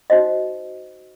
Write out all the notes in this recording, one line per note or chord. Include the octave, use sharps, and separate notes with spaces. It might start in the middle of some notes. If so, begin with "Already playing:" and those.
D#4 F#4 C5 D#5